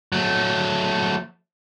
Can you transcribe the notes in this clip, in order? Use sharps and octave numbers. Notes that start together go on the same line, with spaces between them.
F#3 A3